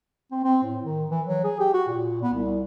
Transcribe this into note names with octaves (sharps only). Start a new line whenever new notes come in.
C4
C4
A2
D#3
E3
F#3
G#4
G4
F#4
A#2
B3
C2